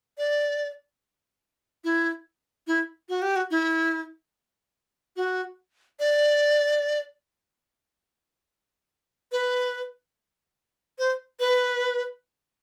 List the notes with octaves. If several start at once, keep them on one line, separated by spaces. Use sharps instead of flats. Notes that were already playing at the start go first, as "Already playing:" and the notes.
D5
E4
E4
F#4
G4
F#4
E4
F#4
D5
B4
C5
B4